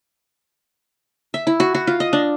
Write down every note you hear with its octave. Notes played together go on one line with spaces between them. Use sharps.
E5
E4
F#4
F#4
F4
D#5
D4